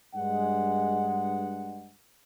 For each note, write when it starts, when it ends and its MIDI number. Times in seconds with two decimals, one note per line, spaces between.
0.15 1.92 43
0.15 1.92 56
0.15 1.92 78